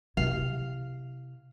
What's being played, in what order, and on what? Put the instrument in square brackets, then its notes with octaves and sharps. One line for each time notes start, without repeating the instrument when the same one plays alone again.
[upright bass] C3 E4 [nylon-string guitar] F5